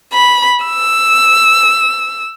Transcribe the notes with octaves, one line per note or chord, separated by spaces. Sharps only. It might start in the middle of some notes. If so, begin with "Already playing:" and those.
B5
E6